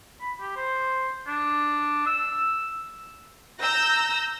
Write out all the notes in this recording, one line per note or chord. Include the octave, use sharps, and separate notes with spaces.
B5
G4
C5
D4
E6
A#5 E6 G6 A#6